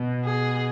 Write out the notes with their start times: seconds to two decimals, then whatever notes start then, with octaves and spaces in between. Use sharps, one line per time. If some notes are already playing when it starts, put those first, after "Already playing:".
Already playing: B2
0.25 G#4